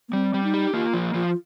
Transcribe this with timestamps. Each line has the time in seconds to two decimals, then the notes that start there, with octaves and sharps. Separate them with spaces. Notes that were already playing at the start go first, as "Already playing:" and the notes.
0.09 A#3
0.13 G3 C4
0.34 G3
0.44 D#4
0.54 G4
0.73 A#3 F4
0.94 F3
1.14 F3 F4